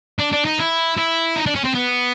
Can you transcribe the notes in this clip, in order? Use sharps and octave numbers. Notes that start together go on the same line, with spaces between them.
D4
D4
D#4
E4
E4
D#4
D4
C#4
C4
B3